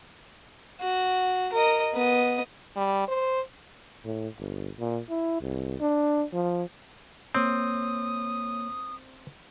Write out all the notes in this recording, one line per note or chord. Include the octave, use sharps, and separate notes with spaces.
F#4
A#4 D#5
B3 D#5
G3
C5
A2
G1
A#2
E4
C2
D4
F3
A#3 C4 C#5 D#6